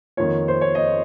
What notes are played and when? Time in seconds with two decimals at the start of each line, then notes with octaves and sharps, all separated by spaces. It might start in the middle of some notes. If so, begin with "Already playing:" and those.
0.17 F2 D#3 A#3 F4 C#5
0.48 C5
0.61 C#5
0.75 D#5